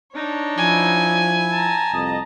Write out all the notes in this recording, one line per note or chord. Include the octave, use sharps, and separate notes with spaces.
D4 D#4 C#5
F3 E4 G#5
A5 A#5
C2 F2 D#5